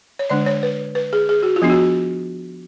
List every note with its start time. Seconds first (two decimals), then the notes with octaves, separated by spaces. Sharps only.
0.19 C#5
0.30 D3 G#3 D4 D5
0.46 C#5
0.63 B4
0.95 B4
1.13 G#4
1.29 G#4
1.43 F#4
1.56 F4
1.62 F3 B3 D4
1.70 F#4